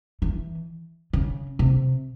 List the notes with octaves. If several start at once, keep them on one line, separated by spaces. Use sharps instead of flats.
E3
C#3
C3